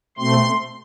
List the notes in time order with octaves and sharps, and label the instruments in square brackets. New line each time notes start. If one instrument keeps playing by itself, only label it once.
[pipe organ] B2 A3 C4 C6